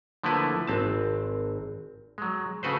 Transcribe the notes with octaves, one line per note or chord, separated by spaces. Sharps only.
D3 F3 A3 A#3 E4 B4
G#1 C4 A5
F#3 G#3
C#3 A3 F#4 B4 C5